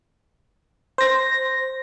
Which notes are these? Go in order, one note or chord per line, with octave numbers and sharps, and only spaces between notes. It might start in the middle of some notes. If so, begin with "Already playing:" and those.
C5 A#6